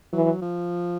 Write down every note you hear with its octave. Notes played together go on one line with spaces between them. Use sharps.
E3 F#3
F3